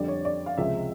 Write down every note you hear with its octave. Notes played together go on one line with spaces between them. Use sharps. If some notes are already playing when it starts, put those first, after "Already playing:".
Already playing: F2 D3 G3 D5
C#5
D5
F5
C#2 C3 F3 G#3 E5